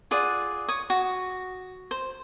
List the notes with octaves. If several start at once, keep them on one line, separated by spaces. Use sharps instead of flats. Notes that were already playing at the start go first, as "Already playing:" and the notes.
F4 G#4 D5 F#5
C#5 D#6
F#4
C5